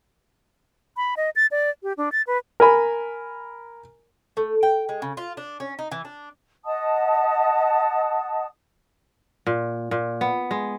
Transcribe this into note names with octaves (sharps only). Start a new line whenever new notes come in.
B5
D#5
A6
D5
G4
D4
A6
B4
A#4 G#5 B5
A3
G5
G#3
C#3
F4
D4
C#4
D#4
E3
D4
D#5 F#5 A5 D#6
A#2
A#2
B3
G#3